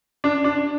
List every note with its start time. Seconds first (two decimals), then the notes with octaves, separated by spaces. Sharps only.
0.24 D4
0.44 D4